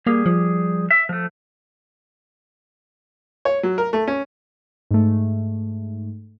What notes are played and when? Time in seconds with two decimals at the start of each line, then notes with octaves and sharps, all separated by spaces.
0.07 G3 A#3 G4 G#4
0.26 F3
0.91 E5
1.09 F3 A3
3.45 C#5
3.63 F#3
3.78 A#4
3.93 A3
4.07 C#4
4.91 G#2 A3